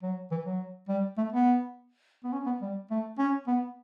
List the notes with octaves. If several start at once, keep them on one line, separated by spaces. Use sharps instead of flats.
F#3
E3
F#3
G3
A3
B3
B3
C#4
B3
G3
A3
C#4
B3